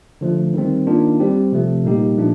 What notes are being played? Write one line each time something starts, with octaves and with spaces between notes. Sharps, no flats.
D3 F3 A3
D#3 G3 C4
D#3 A#3 D4 F4
G3 C4 G4
C3 F3 A3
A#2 G3 A#3 D#4 G4
A#2 F3 A3 D4